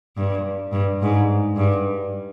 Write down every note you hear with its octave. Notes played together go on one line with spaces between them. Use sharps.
G2
G2
G#2
G2